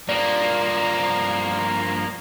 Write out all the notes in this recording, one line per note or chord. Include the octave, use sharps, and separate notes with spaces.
G2 F3 A#3 D5 A#5